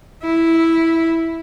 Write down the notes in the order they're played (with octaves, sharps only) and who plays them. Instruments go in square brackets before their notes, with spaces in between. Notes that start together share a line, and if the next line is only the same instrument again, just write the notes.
[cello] E4